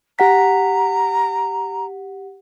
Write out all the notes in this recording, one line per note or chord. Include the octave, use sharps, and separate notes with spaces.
G4 F#5 A#5 B6